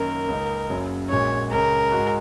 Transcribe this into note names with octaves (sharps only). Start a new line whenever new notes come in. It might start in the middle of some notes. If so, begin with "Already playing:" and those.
Already playing: F#2 D#3 A#3 A#4
C#2 C#3 A#3 D#4
F#1 F#2 C#3 F#3
A#1 A#2 G#3 C#4 F#4 C#5
C#2 C#3 G#3 A#4
G#2 G#3 F#4